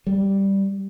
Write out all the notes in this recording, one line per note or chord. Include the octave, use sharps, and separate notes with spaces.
G3